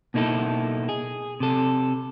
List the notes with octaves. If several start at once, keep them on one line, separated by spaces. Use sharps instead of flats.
B2 A#3 D#4 E4 A4
G#4
C3 A4